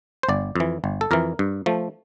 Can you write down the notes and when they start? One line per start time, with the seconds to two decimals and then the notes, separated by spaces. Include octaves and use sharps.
0.23 C5
0.29 G1 D5
0.56 F2 E3
0.84 G1
1.01 A4
1.11 F2 E3 A#4
1.39 G2
1.66 F3 A3